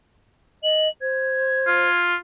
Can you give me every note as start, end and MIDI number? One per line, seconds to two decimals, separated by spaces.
0.63 0.88 75
0.63 0.88 102
1.01 1.88 72
1.01 2.01 92
1.67 2.16 65